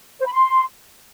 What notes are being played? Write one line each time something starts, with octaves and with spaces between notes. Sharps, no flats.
C5
B5
C6